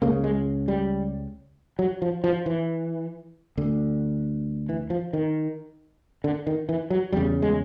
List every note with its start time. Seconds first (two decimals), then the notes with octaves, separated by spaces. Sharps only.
0.02 C#2 C#3 A#3
0.24 G#3
0.68 G3
1.79 F#3
2.02 F3
2.24 F3
2.46 E3
3.57 D2 D3
4.69 E3
4.90 F3
5.13 D#3
6.24 D3
6.47 D#3
6.69 E3
6.90 F#3
7.12 E2 C#3 G3
7.42 G#3